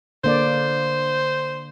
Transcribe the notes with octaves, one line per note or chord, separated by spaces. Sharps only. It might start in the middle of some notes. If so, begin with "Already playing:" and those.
D3 A#3 C5 D5